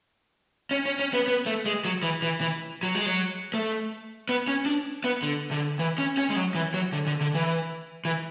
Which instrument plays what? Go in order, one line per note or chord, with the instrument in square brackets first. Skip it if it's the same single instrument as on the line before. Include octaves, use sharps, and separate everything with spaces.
[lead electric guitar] C#4
C#4
C#4
B3
B3
A3
G#3
F#3
E3
E3
E3
F#3
G#3
F#3
A3
B3
C#4
D4
B3
D3
D3
E3
C#4
C#4
G#3
F#3
E3
F#3
D3
D3
D3
E3
E3